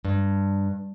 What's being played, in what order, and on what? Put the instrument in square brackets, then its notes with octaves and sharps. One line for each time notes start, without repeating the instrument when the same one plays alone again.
[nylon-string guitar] G2